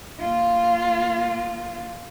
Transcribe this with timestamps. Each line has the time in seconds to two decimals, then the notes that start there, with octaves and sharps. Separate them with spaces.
0.20 A#3 F4